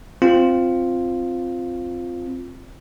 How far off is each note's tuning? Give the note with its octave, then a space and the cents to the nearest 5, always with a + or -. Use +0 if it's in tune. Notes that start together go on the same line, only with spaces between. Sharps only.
C4 +0 F4 +0